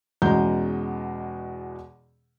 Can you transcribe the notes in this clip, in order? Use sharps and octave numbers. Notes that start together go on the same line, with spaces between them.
E2 B2 G#3 C#4 A#5 G6